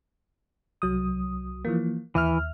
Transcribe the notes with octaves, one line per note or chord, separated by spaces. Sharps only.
C2 F#3 D#6
E3 F3 A#3
D#2 E3 E5 F6